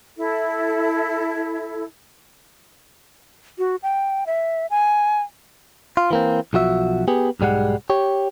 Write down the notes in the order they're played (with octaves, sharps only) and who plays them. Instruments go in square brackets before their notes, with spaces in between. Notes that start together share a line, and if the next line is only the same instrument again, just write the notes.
[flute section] E4 A4
[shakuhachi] F#4
G5
E5
G#5
[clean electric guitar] F4
E3 A#3 C4
B1 F3 F#4 E5
B3 G4 G#4
B1 G#2 G3 G#3 F#5
G4 C#5